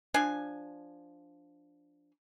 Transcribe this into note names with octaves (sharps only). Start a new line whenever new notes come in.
F3 D4 G#5